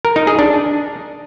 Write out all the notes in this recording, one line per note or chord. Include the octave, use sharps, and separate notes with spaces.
A#4
D#4
G#4
D4